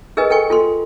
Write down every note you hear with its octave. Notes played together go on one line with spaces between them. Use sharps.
G#4 A#4 B4 D#5 G#5
A4 G5 G#5 C#6
F4 A4 C6